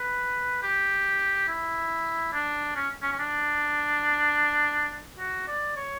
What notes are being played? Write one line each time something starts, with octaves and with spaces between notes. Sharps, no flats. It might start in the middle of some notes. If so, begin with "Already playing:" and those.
Already playing: B4
G4
E4
D4
C#4
C#4
C#4
D4
F#4
D5
C#5